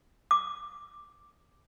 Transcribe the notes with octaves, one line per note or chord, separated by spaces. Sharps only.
D6